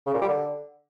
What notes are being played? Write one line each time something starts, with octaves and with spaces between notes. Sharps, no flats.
C#3
A#2
G3
D3